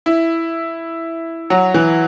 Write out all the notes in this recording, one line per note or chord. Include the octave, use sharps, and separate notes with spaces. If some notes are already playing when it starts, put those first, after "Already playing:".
E4
F#3
E3